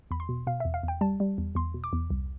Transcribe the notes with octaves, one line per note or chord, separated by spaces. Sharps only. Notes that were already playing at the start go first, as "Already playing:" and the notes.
E2 B5
C6
B2
B2 F5
E2 E5
F5
E2 G5
G3 A5
G3
E2
E2 C6
B2
D6
E2
C2